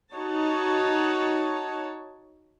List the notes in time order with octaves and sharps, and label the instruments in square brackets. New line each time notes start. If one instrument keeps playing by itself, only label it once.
[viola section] D#4 F#4 C#5 A5